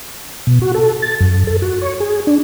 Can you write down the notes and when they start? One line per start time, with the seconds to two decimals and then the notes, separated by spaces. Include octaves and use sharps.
0.47 B2
0.62 F#4
0.74 A4
1.02 A6
1.20 F#2
1.47 A4
1.62 F#4
1.82 C#5
2.00 G#4
2.27 D4